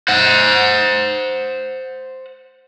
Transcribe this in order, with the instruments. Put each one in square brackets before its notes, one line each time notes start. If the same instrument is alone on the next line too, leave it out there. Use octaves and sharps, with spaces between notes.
[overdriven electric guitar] C5 F#5